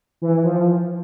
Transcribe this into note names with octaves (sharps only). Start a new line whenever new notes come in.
E3
F3